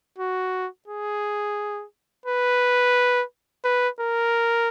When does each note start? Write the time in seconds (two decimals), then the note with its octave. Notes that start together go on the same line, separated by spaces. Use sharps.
0.18 F#4
0.88 G#4
2.26 B4
3.64 B4
4.00 A#4